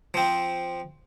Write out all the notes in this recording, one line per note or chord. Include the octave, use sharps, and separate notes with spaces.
F3 C4